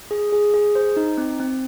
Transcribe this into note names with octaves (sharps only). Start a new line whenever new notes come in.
G#4
G#4
G#4
C5
D#4
C4
C4